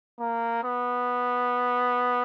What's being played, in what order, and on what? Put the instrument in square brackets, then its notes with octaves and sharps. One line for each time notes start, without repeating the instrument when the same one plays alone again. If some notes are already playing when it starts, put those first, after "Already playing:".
[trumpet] A#3
B3